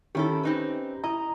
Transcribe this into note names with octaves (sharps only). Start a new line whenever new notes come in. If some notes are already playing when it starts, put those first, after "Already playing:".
D#3 C#4 E4 G4 A4
C4 D#4 B4
E4 D#5 A#5